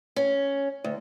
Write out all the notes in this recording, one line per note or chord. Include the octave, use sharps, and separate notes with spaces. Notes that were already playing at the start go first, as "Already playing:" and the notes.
C#4
D2